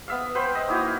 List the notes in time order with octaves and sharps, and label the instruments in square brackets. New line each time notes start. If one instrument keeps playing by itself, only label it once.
[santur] B3 E5 F5
B4 C5 G5 C6
D#5
A#3 D#4 E4 F#4
F5